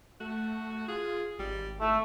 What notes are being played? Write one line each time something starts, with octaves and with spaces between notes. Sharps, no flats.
A3 F#4
F4 G#4
G#1 G3
A3 E4